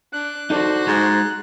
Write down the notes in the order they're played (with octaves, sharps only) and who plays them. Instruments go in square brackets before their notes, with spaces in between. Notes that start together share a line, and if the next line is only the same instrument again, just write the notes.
[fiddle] D4 [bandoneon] F#6
[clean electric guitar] D#4 A4 D5 [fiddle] F#4 C5
[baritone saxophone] G#2 [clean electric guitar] G#3